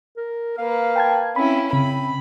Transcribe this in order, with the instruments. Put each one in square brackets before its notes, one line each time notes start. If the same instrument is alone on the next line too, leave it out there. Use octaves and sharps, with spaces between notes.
[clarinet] A#4
[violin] A#3 B4 [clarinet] F5
[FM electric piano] G5 A5 G#6
[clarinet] C4 [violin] C#4 E4 [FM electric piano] B5
[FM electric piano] C#3 [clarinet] C4 [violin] B5